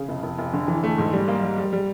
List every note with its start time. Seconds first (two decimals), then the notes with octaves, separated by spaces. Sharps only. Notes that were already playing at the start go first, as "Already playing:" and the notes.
Already playing: C#3
0.08 F1
0.23 F1
0.39 F1
0.53 D3
0.68 E3
0.84 A3
0.98 G#2
1.13 G3
1.28 A#3
1.42 G3
1.58 G3
1.73 G3